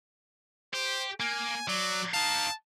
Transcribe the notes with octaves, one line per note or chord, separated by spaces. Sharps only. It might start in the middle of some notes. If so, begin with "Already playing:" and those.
G4 C5
A#3 G#5
F#3 D5
D#4 F5 A5